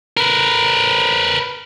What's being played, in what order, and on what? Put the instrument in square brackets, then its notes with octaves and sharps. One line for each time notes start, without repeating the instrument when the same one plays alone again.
[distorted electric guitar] A#4 B4